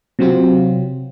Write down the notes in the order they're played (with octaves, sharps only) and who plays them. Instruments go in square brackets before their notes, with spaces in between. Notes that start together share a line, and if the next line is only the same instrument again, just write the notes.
[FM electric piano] C3 F#3 C4 F4